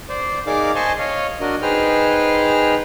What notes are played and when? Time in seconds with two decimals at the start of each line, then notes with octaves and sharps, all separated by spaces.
0.09 C5 D5
0.47 D#4 G#4 A#4 D5 F5 D6
0.75 C5 D#5 G#5 A5 C6 C#6
0.99 C#5 D#5 F5
1.41 D4 F#4 A#4 D#5
1.62 D#4 G#4 B4 C5 G5 F6